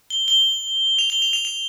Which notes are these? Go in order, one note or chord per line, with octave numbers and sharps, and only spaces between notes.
G7
G7
F7
G7
F7
F7
F7